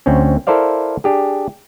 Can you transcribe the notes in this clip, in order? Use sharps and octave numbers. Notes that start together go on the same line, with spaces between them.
D2 C4 C#4
E4 A4 A#4 C5 D5 F5
D4 G4 G#4